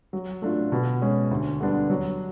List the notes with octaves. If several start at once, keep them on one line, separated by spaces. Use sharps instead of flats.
F#3
A3 D4 F4
B2
G#3 C#4
D2
D3 G3 B3 D4
F#3